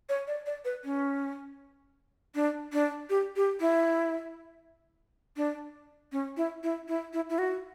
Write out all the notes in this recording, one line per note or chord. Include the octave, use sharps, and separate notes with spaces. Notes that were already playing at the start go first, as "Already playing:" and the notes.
C#5
D5
D5
B4
C#4
D4
D4
G4
G4
E4
D4
C#4
E4
E4
E4
E4
E4
F#4